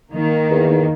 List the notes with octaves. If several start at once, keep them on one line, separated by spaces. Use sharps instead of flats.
D#3 A#3
E2